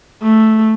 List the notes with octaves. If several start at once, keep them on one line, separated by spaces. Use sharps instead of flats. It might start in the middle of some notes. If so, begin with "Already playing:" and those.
A3